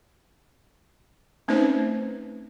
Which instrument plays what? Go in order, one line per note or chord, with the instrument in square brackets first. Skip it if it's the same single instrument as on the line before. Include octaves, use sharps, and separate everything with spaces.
[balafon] A3 C4 C#4 D#4 B4 C5